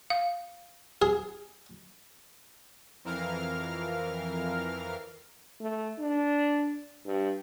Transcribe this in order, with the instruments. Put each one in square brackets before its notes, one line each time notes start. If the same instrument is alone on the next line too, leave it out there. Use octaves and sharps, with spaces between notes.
[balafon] F5
[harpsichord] G#4
[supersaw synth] F2 E3 A#4 F5 F6
[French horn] A3
D4
G2